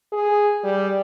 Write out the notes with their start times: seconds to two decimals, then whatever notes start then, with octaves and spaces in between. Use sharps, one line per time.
0.12 G#4
0.64 G3